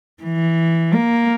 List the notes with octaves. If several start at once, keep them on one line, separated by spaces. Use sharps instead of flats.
E3
A#3